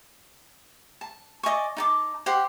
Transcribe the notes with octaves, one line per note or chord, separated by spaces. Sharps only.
A5
D5 D#5 G#5 C#6
D#4 A5 D6
G4 C5 F#5